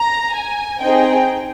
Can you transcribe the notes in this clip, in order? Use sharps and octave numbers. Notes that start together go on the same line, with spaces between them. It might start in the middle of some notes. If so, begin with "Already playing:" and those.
Already playing: A#5
G#5
C4 D#4 G#4 G5